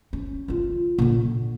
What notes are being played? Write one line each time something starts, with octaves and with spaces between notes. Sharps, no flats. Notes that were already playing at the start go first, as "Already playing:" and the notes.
C#4
D#3 F4
A#2 D3